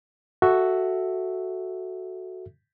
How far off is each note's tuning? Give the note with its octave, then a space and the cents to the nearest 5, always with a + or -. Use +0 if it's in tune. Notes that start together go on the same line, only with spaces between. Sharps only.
F#4 +5 A4 +0 E5 +0